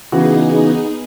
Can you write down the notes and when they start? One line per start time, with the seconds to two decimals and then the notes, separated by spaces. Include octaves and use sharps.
0.12 C#3 E3 B3 D#4 F#4 G#4